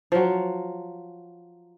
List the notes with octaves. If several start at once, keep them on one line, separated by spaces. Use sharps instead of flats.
F3 F#3